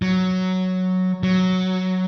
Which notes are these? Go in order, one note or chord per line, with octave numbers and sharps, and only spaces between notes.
F#3
F#3